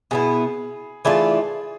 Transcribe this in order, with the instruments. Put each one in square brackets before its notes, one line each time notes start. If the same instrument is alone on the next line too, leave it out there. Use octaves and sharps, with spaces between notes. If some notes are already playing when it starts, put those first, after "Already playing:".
[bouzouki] B2 B3 E4 [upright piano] G#4
[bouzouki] E3 A3 D4 F4 [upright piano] G#4